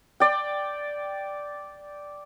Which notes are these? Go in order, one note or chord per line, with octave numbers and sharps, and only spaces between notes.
D5 G5